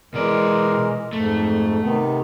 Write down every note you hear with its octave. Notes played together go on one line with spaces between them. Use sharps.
B2 E3 G#3 A#4 D5
F2 G#2 A3
C3 D#3 B3